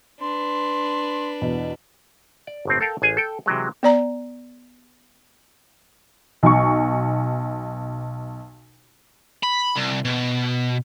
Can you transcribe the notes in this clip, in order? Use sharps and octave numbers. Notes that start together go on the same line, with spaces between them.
D4 B4 C6
E2 B2
D5
G1 A2 C4
A4 A#4 F5 G5 A5
A1 G#4 G#5
A4 G5
C3 E3 F#3 G#3
B3 D5 A#5
B1 C#6
B5
C2
B2